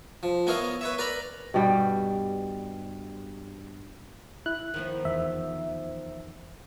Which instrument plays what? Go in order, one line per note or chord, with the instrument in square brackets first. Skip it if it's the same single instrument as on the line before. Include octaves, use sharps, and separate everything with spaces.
[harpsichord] F3
B3 E4 A#4 C#5 D#5 F5
B4 C#5 E5
A#4 B4 D5 A#5 B5
[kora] G2 B2 G3 G5
[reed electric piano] E4 [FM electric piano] F#6
[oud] D#3 F3 B3
[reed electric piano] E2 [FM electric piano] E5